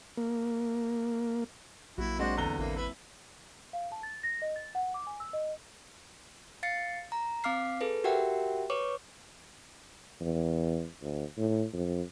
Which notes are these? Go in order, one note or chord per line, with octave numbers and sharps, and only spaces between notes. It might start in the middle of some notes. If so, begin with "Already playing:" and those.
A#3
A#1 F#3 A#3 E4 F#4
G#3 C4 D4 F#4 C5
E2 D3 A#5 G7
A1 A#3 E4
B4 E5 B5
F5
A5
A6
A#6
D#5
A6
F#5
D6
G#5
E6
D#5
F5 A6 C7 C#7
A#5
C4 F5 D6 F6 C7
G#4 A4 B4
F#4 G4 A#4 E5 F#5 G5
B4 C#5 C#6 D6
E2
D2
A2
F2